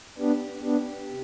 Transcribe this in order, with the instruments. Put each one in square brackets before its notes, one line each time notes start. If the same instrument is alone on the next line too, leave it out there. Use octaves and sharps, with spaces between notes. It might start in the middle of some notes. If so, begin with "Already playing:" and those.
[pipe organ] B3 D4 [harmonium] G4
[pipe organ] B3 D4 [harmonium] G4
[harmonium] C3